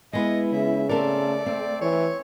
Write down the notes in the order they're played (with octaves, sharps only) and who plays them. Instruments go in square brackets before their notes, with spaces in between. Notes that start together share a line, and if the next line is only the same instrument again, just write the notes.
[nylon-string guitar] G#3 B3 [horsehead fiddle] E4 [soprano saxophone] D#5
[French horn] C#3 [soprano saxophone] E5
[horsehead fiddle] A3 [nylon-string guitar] C4 A4 A#4 [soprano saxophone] D5
[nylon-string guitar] C4
[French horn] E3 [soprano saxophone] C#5